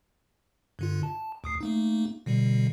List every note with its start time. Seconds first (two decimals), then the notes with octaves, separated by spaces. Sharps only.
0.79 G2 D3 F4
1.03 A5
1.44 D2 D#6 C7
1.61 A3 A#3 D#4
2.26 B2 D3 G3